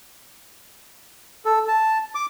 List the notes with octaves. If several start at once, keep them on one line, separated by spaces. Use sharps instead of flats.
A4
A5
D6